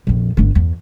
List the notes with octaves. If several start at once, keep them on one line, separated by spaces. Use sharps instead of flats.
A#1 F2
G1 D3
E2